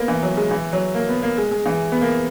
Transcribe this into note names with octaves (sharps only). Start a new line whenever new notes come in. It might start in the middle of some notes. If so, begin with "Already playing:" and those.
Already playing: A#3 B3
E3
F#3
G#3
E3
F#3
A#3
B3
A#3
G#3
G#3
E3
B3
A#3